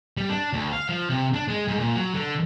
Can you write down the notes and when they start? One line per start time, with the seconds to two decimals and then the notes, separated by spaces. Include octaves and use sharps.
0.17 G3
0.30 D4
0.53 D2
0.73 F5
0.89 F3
1.09 C3
1.34 D4
1.48 G#3
1.68 G#2
1.80 A#2
1.96 F#3
2.14 D3